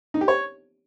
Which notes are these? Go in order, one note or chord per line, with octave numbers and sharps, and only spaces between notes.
D#4
G4
C#5